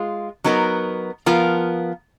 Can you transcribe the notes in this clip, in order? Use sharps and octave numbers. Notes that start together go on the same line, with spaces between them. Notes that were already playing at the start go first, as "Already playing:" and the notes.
Already playing: G#3 F4
F#3 B3 D#4 A#4
F3 B3 F4 A#4